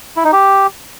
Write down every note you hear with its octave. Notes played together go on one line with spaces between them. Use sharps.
E4
D#4
G4